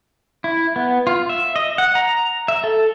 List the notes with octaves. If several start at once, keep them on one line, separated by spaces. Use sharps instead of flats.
E4
B3
F4
E5
D#5
F#5
A#5
E5
A4